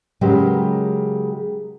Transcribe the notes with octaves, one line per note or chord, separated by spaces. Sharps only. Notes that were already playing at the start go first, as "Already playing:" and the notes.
C#3 F#3 G#3 A#3 G4 B4